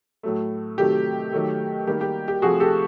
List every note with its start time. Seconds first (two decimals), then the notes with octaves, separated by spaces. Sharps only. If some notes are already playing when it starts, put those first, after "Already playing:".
0.23 A2 F#3 A3
0.78 C3 D#3 F#3 A3 G4
1.32 D#3 F#3 A3
1.87 D#3 G3 A#3 G4
2.01 G4
2.28 G4
2.42 C3 F3 A3 F#4 G#4
2.60 G4 A4